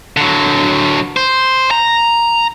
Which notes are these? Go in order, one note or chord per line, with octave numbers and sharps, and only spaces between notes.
D3 F#3
C5
A#5